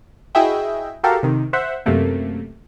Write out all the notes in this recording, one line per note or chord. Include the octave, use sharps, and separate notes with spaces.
E4 F#4 G#4 D#5 E5 G5
F#4 G4 A4 A#4 F5
C3 D#3
C5 E5 F#5
F#2 C3 A3 A#3